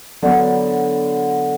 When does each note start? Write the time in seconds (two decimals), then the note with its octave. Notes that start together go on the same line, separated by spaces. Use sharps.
0.23 D3 F#3 B3